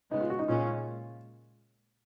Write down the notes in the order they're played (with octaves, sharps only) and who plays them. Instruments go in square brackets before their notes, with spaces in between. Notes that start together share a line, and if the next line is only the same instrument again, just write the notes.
[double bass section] C#3 G#3 B3 [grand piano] D#4
[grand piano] F4
F#4
D#4
[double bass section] A#2 G#3 C#4 [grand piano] F4